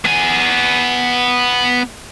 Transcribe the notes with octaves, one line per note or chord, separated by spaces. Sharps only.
B3 G#5